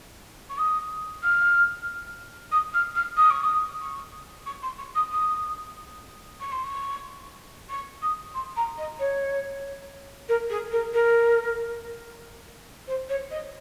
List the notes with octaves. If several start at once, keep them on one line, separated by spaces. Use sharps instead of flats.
C#6
D#6
F6
D#6
F6
F6
D#6
C#6
D#6
C#6
C#6
C6
C#6
D#6
D#6
C#6
C6
C#6
C#6
D#6
C6
A#5
D#5
C#5
A#4
G#4
A#4
A#4
C5
C#5
D#5